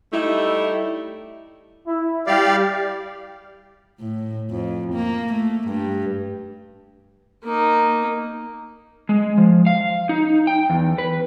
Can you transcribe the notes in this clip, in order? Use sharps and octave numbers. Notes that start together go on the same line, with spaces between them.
G3 A3 D#4 E4
E4
G3 G4 D5 F5
A2
F2
A#3
A3
G2
A#3 D#4
G#3
F3
F5
D#4
G5
E2
B4